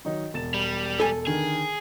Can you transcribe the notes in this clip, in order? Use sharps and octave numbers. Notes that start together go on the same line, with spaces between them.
D#3 F#3 D#4
E1 A6 E7
G3
A4 G#5
D3 D#3 G#4 A#4